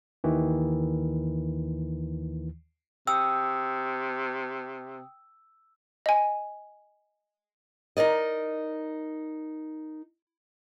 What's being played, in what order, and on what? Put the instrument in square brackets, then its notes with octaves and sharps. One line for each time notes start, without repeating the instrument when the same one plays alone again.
[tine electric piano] D#2 D#3 E3
[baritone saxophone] C3 [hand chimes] G5 D#6 [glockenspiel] E6
[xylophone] D#5 G#5
[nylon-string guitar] D#4 A#4 D5 D#5